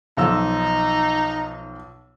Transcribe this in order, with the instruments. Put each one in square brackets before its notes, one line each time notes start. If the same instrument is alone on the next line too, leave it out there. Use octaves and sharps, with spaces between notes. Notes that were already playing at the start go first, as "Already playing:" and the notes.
[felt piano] B1 F3 E6 [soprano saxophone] D#4